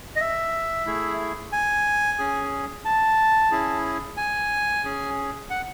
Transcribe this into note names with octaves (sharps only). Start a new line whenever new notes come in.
D#5
E5
A3 E4 G#4
G#5
C#4 G#4
A5
C#4 E4 G#4
G#5
C#4 G#4
F#5